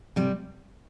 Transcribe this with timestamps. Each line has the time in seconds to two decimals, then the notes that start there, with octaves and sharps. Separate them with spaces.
0.16 C3 G3